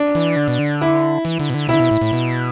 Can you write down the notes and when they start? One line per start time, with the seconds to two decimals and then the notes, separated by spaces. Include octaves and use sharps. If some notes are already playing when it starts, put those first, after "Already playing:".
Already playing: D4
0.15 E3
0.37 D3
0.48 B2
0.59 D3
0.81 E4
1.25 E3
1.40 D3
1.50 B2
1.54 D3
1.68 B2 E4
1.75 D3
1.80 B2
1.91 A2
2.01 A2
2.13 B2